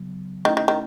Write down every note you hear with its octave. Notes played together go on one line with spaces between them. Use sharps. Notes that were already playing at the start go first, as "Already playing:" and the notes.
Already playing: C#3 F#3 B3
D#3 A3 C#4 E4
D#3
D#3